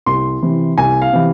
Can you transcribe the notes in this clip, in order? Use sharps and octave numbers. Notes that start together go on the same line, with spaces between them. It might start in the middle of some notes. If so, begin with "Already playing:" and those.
C2 C6
C3 E3
C2 G#5
F5
C3 E3